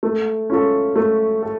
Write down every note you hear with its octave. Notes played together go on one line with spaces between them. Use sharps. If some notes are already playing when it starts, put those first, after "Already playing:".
A3
C#4 F4 A4
A3
A4